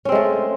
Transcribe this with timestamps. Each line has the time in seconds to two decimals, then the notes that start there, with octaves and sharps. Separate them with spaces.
0.05 C#4
0.09 C4
0.12 G#3
0.15 A3